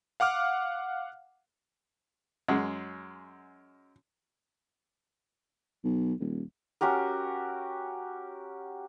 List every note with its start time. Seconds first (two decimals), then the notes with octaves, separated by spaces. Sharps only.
0.20 F5 F#5 D6 F6
2.48 F#2 G#3 F#5
5.84 B1
6.19 D#1
6.81 C#4 F#4 G4 A#4